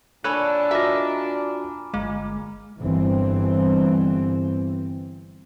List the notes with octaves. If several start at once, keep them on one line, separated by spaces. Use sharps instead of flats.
A#2 D4 A4 C#5 G#5 B5 F#6 D#7
F4 F#4 D#5 E5 A#5 D6 F6
G1 G#3 A#3
G1 E3 C4